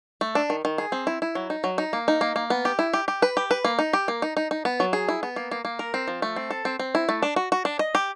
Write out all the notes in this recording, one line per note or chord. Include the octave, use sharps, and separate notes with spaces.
A3
D4
D#3
D#3
G#4
C4
E4
E4
F#3
D#4
F#3
D#4
A#3
D#4
A#3
A#3
B3
G4
E4
G4
G4
B4
G4
B4
A#3
D#4
G4
A#3
D#4
D#4
D#4
B3
F#3
G#4
E4
B3
A#3
A#3
A#3
A#4
C4
F3
A3
C4
A4
C4
C4
E4
A3
D4
F#4
F#4
D4
D#5
G4